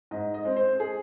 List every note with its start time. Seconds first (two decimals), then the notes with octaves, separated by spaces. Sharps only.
0.11 G#2 D#5
0.34 D#5
0.45 G#3 C4
0.56 C5
0.80 G#4